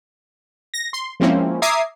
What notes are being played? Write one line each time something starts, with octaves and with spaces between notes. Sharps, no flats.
A#6
C6
F3 G#3 A#3 C4 C#4 E4
E5 A#5 D6 D#6 G#6 C7